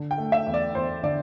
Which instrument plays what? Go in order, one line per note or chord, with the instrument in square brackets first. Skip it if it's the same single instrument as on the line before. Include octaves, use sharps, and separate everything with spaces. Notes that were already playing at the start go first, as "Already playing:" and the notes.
Already playing: [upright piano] D3
G5
A3
E5
E2
D5
E2 C5
D3 D5